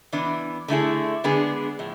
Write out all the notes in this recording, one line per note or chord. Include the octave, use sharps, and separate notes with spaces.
E3 B3 D4
D3 A3 E4 G#4
D3 G#3 B3 D4 G#4
A2 F3